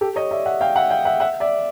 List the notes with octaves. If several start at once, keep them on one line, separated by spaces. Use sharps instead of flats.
G4 A4
C#5 D#5
D5 E5
E5 F#5
F5 G5
E5 F#5
F5 G5
E5 F#5
E5 F#5
D5 E5